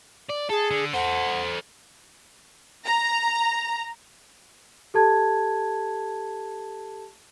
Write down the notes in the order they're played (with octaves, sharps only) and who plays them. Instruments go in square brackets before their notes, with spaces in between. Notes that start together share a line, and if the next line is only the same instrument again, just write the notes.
[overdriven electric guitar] D5
[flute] G#4 [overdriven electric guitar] A4
[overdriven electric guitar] D3
[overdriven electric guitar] A4 C5 [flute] F#5
[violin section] A#5
[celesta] G4 A4 A5 G#6